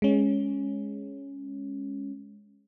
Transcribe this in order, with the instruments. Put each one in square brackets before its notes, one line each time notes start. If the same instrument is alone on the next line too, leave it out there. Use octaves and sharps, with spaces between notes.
[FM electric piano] G#3 C#4